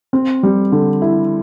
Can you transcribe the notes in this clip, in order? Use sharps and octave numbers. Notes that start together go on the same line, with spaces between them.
C4
G3
D3
E4